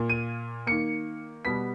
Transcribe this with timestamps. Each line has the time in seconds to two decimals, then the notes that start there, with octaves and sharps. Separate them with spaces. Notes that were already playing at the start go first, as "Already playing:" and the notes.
Already playing: A#2 A#3
0.10 D#7
0.67 D#3 A#3 C#7
1.45 B2 G3 B3 B6